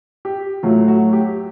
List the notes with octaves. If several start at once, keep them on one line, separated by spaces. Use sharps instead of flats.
G4
A2 F#3 A3 F4
F#4
G4